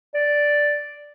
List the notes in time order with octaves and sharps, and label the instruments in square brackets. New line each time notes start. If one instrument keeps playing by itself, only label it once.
[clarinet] D5